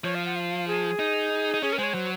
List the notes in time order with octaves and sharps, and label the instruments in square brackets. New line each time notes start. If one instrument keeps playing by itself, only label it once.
[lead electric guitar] F3 [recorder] C#5
[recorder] F5
F#5
F5
G#4
[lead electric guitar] D#4
D#4
[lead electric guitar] C#4 [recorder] G#4
[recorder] A#4
[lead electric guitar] G#3 [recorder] C5
[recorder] C#5
[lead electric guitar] F#3 [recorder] C5